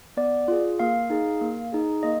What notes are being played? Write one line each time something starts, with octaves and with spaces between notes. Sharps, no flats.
B3 D5
F4 G#4
A#3 F5
D#4 G#4
A#3
D#4 G#4
A#3 D#5